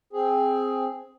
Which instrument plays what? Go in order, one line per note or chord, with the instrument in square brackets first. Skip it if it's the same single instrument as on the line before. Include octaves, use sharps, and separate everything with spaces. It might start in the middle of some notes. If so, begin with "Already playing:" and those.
[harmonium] C4 G#4